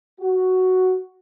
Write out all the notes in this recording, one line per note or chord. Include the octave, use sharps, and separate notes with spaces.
F#4